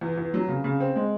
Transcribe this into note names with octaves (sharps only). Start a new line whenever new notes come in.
E2
E2
F#3
C#3
C#3
C4
G#3